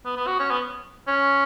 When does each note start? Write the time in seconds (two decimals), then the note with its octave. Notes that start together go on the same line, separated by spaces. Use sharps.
0.05 B3
0.17 B3
0.27 F#4
0.39 C#4
0.51 B3
1.08 C#4